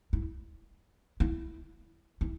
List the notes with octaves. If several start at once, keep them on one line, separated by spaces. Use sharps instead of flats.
E4
E4
E4